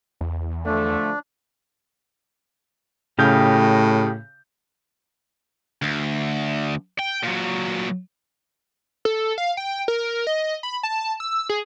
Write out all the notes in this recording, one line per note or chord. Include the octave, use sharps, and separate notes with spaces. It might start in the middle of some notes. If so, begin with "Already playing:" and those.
E2
D3 F3 A3 D4
A2 C#3 G4 D#5 F5 G6
D2
G5
A#2 F#3
A4
F5
G5
A#4
D#5
B5
A5
E6
G#4